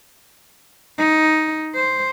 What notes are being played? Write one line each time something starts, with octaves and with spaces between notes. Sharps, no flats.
D#4
C5